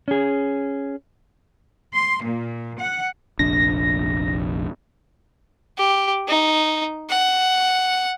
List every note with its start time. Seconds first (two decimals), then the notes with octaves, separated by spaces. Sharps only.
0.08 C#4 G#4
1.93 C6
2.23 A#2
2.79 F#5
3.39 F1 A#1 D4 A#6
5.78 G4
6.28 D#4
7.10 F#5